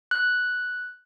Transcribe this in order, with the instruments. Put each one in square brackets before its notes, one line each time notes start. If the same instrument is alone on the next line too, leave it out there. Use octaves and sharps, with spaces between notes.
[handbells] F#6